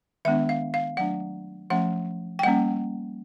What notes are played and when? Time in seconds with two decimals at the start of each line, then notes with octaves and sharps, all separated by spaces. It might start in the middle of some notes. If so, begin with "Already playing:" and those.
0.25 D#3 G#3 B3 D4 E5
0.49 F5
0.74 F5
0.97 F#3 A3 D4 F#5
1.70 F3 A3 C#4 F#5
2.39 G5
2.43 G3 A#3 C#4 F#5